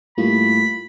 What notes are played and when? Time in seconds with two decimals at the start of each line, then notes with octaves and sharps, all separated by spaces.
0.18 A2 G3 A#3 F4 B5